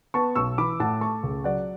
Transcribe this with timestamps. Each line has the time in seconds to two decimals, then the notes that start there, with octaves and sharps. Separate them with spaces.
0.14 B3 A5 C#6
0.35 B1 C#6 E6
0.58 E3 B5 D6
0.80 A2 F#5 A5
1.01 A3 A5 C#6
1.23 C#2
1.44 F#3 D5 F#5